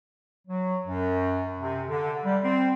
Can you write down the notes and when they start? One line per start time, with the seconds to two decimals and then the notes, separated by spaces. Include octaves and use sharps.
0.48 F#3
0.86 F#2
1.59 C3
1.89 D3
2.25 G3
2.44 C4